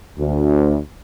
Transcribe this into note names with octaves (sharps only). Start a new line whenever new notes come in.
D2